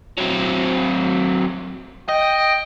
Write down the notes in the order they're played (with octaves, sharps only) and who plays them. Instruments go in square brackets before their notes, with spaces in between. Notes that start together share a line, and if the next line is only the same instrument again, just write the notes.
[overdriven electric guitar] F#3 C4
[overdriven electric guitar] D#5 [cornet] G5